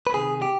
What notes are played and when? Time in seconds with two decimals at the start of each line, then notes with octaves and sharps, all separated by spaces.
0.07 B4
0.14 C3 D#3 G#4
0.42 G4